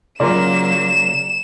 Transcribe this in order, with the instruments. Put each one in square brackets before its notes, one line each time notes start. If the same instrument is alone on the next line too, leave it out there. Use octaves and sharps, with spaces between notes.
[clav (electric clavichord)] C#3 F4 A#4 [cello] F#3 A#3 [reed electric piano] D5 [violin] E7